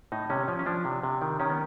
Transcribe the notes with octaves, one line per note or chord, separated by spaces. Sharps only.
A2 D#4
C3 C#4
F3 C#4
C#4
F3 D4
C3
C3
D#3
D#3 C#4
B3